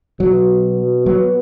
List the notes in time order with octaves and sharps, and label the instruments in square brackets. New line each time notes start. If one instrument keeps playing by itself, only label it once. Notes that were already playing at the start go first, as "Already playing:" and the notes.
[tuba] B2 [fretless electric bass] F#3
[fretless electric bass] F#3 [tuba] B3